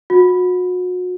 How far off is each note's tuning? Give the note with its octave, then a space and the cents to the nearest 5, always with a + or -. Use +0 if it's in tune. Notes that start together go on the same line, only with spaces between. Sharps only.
F#4 -35